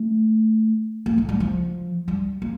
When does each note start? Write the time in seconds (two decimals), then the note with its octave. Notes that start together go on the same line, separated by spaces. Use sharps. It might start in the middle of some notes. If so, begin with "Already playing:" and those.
Already playing: A3
1.06 A#3
1.18 A3
1.29 G3
1.40 F3
2.08 G3
2.42 A#3